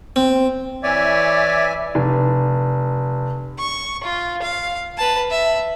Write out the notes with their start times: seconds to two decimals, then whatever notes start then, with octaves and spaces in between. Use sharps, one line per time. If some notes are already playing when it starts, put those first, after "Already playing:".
0.16 C4
0.83 E3 C#5 D5 E5 G#5
1.95 F1
3.59 C#6
4.03 F4
4.42 F5
4.98 B4 A5
5.30 E5